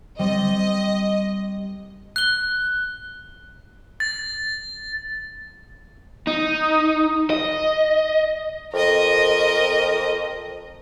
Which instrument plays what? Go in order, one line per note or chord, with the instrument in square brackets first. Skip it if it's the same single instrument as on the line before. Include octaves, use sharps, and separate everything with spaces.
[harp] G3 C4 [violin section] D#5
[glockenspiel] F#6 G7
[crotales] A6
[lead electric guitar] D#4
D#5
[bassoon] F2 [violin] A#4 D#5